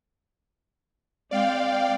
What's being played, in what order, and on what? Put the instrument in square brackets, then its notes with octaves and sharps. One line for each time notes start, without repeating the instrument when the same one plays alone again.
[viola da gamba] G#3 C4 [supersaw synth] D5 F5 G5